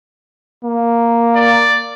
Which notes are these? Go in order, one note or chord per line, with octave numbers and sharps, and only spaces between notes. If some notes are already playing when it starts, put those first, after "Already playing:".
A#3
D5